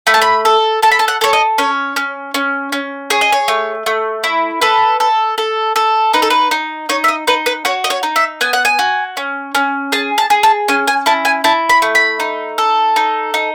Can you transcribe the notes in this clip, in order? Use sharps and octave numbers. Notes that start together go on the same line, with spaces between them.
A3 B5
A5
B5
A4
A4 A5
B5
A5
F#5
A4 C#5
D#5
C#4 C#5
C#4
C#4
C#4
G#4 C#5
D#5
C#5
A3
A3
E4
A4 B4
A4
A4
A4
D#4 B4
A4
B4
D#4
D#4 C#5
E5
D#5
D#4 B4
B4
F#4 C#5
D#5
C#5
D#4
E5
B3 G#5
F#5
G#5
F#4
C#4
C#4
G#4 A5
A5
G#4
A5
C#4 G#5
G#5
E4 A5
G#5
E4 A5
B5
A3
B5
D#4
A4
D#4
D#4